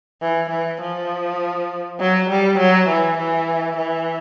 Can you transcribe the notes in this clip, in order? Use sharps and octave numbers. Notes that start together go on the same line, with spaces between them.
E3
E3
F3
F#3
G3
F#3
E3
E3
E3